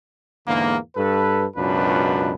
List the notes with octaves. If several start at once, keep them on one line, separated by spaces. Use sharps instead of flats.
E2 G#2 D3 A#3
G2 A4 B4
C#2 F#2 B2 D4 F4 B4